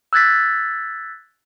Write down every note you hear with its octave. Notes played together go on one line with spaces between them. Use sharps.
E6 F#6 G#6 A6 B6